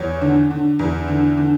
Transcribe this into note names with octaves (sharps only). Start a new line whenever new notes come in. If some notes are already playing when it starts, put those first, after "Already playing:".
Already playing: E2 C#5
D3
D3
E2
D3
D3